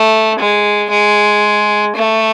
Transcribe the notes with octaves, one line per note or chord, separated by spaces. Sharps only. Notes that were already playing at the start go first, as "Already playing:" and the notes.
Already playing: A3
G#3
G#3
A3